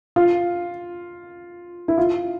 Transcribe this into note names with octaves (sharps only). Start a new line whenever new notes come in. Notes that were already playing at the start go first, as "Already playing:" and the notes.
F4
E4
F4